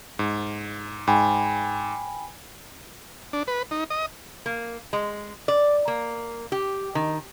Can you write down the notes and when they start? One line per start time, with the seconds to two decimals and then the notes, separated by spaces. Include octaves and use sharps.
0.19 G#2
1.07 G#2 G5 G#5 B5
3.33 D4
3.47 B4
3.71 D#4
3.90 D#5
4.46 A#3
4.93 G#3
5.48 D5
5.88 A#3
6.52 G4
6.95 D#3